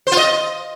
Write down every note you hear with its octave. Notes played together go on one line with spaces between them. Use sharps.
C5
F4
D#5